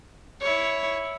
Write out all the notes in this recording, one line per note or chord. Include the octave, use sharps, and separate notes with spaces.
E4 C#5